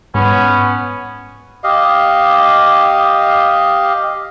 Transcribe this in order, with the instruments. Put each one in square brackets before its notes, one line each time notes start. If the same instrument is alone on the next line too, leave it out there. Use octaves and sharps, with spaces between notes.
[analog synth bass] G#2 [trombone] B3 [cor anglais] C#4
[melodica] G4 D#5 F5